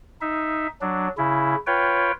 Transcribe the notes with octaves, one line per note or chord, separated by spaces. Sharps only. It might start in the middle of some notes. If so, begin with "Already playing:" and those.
D#4 E5
F#3 D4
C#3 E4
F4 B4 C#5 G5